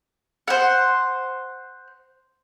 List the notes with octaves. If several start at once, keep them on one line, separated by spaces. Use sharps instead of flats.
C5 F#5